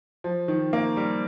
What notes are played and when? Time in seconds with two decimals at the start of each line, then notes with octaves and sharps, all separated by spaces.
0.24 F3
0.48 D#3
0.73 A#3
0.97 G3